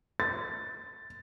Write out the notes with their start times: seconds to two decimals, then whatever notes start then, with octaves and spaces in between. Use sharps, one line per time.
0.20 A6